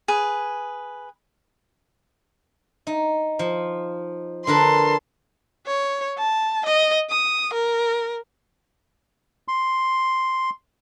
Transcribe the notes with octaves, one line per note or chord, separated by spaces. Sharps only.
G#4 B4
D#4
F3
D3 A#4 B4 A5 C6
C#5
A5
D#5
D#6
A#4
C6